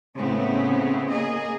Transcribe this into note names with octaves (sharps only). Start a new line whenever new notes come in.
A2 C#3 B3 C4
A#3 G#4 D#5